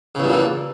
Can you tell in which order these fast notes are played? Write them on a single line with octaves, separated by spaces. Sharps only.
C#3 E2 G2 A#2 E3